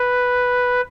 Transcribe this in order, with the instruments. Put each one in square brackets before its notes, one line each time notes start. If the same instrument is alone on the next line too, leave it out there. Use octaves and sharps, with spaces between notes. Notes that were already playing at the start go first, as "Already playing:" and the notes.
Already playing: [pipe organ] B4